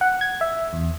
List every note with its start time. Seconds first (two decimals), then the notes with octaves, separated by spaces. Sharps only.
0.01 F#5
0.21 G#6
0.41 E5
0.73 E2